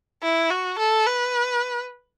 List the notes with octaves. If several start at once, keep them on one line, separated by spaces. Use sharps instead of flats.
E4
F#4
A4
B4